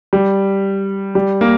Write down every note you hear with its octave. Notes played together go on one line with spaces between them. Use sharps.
G3
G3
A#3